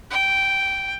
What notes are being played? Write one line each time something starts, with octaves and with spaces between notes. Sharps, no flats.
G5